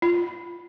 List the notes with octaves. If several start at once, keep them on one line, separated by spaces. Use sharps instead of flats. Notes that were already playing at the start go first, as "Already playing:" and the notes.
F4